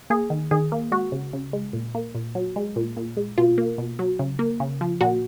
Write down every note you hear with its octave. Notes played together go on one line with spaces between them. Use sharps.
A#3 G#4
D#3
D#3 G#4
A#3
G#3 F#4
C#3
C#3
G#3
A#2
A#3
A#2
F#3
G#3
A#2
A#2
G#3
B2 F4
A#3
B2
F#3
C#3
A#3
C#3
F3
A#2 F#4